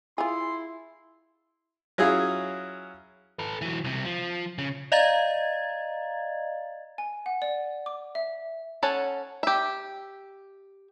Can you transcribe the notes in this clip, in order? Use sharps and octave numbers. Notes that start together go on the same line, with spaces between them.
E4 F4 G#4 C6
F#3 C#4 E4 F4 G#4
A4 B4
E3 F#3
C2 C3
F3
C#3
D5 D#5 F5 A#5 G#6 A6
G#5
F#5
D5
D6
E5
C#4 A4 C#5 F#5 A5
G4 E5